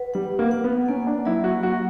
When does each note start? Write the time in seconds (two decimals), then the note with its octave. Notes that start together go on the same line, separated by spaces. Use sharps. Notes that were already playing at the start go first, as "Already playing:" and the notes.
Already playing: B4 F#5
0.14 G3 F#5
0.39 A#3
0.51 F#5
0.64 B3
0.88 A#3 C#4
1.07 D4
1.25 F#3 E4
1.44 F#4
1.63 A#3 F#4